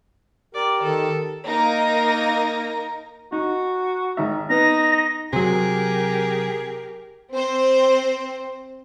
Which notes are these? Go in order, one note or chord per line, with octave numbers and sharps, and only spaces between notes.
G4 A#4 D5
D#3 A4
A#3 D#4 A#4 A#6
D#4 F#4
G#1 D#4 E5
B3 D#4 B4 A#6
C3 F#3 G4 G#4 A#4
C4 C5